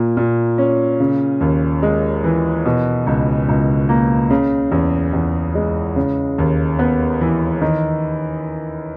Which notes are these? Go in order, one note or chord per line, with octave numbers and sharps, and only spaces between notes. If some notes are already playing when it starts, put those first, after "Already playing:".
Already playing: A#2 A#3
A#2
C#4
C#3
D#2
G#3
E3
B2
C#2
C#2
A#3
C#3
E2
E2
G#3
C#3
D#2
B3
E3
D#3